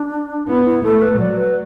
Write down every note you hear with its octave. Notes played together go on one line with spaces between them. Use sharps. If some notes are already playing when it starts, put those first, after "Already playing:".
Already playing: D4
B3 E4
E4
A3 A4
B4
F#3 D5
B4